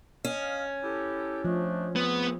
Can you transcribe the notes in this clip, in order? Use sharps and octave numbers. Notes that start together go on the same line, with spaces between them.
C#4 D#5 F5
E4 G4 A4
F3 A3 D4 D#5
A3 B3 C4 G#4